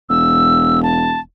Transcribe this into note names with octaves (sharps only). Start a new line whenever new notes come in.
E1 E6
A5